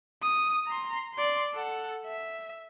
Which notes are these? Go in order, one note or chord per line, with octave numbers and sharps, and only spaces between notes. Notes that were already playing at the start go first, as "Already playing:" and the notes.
D#6
A#5 C6
D5 C6
A4 F#5
E5